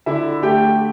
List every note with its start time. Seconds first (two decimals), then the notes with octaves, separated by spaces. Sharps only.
0.06 D3 E4 E5
0.42 A3 G4 G5